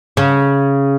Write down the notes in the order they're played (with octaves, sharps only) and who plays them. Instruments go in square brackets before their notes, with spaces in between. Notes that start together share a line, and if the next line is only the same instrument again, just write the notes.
[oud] C#3